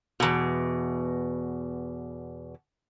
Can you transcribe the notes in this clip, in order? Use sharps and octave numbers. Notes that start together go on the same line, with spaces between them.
E2 B2